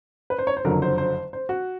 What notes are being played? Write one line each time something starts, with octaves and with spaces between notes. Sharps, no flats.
B4
C5
C#5
C5
F#1 F2 D3 F#3 A#4
C5
C5
C5
F#4